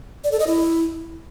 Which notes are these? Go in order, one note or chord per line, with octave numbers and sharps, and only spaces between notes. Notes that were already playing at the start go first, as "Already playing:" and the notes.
D5
A4
D#5
E4